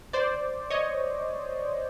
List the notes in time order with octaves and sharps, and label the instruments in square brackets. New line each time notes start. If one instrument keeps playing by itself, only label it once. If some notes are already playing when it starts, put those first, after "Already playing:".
[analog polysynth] C5 D5
C#5 D#5